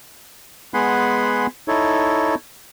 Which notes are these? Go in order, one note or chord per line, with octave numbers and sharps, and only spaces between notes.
G#3 B3 F#5 G#5 B5 C6
D#4 E4 A4 C#5